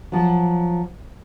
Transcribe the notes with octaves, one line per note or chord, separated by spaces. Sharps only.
F3 F#3